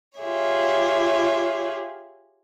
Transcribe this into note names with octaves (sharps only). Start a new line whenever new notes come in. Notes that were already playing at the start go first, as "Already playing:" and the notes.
F4 G4 G#4 C#5 E5